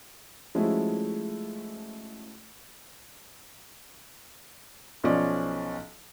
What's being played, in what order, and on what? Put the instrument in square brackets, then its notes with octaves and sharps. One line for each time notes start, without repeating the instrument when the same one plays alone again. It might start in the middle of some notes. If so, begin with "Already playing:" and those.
[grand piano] F3 G#3 A3 C#4 E4 F#4
[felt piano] B1 F3 C#4 D5